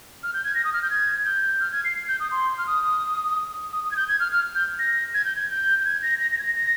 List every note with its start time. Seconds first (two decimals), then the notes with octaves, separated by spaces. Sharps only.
0.23 F6
0.34 G6
0.44 G#6
0.55 A#6
0.64 D#6
0.73 F6
0.82 G6
0.90 G#6
1.25 G6
1.60 F6
1.72 G#6
1.85 C7
2.08 G6
2.20 D#6
2.31 C6
2.58 F6
2.67 D#6
3.73 D#6
3.84 D#6
3.91 G#6
3.96 G6
4.08 G#6
4.20 F6
4.32 F6
4.55 G6
4.79 A#6
5.14 G#6
5.25 G6
5.36 G#6
5.50 G6
5.80 G6
5.85 G#6
6.03 A#6
6.20 A#6
6.32 A#6
6.39 G#6
6.43 A#6
6.56 A#6